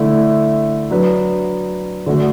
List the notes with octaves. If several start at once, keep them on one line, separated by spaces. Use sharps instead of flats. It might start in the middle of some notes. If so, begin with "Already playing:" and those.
Already playing: D3 A3 E4
F#3 D4 B4
D3 A3 F#4